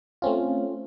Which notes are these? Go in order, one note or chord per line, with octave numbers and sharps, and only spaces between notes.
A3 C4 C#4 F4